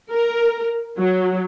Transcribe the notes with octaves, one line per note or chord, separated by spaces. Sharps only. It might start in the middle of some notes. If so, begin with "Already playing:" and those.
A#4
F#3